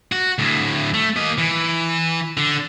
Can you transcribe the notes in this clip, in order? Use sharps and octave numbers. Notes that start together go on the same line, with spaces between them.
F#4
D2 A2
A3
A#3 D#5
E3
D3